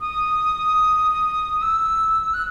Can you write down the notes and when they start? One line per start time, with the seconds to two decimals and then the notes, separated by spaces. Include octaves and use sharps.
0.01 D#6
1.62 E6
2.34 F#6